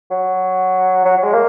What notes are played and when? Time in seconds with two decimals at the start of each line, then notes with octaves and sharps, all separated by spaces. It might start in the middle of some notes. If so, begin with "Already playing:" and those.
0.11 F#3
1.05 F#3
1.17 F#3
1.23 G#3
1.33 A#3